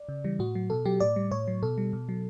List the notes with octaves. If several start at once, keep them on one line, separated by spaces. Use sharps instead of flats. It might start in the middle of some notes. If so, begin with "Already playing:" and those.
Already playing: D5
C#3
E3 G3
A2 F#4
F#3
B2 A4
F#3 G4
A2 D5
G3
A2 C#5
F#3
B2 A4
G3
B2
F#3